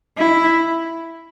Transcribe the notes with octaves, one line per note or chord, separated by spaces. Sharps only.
E4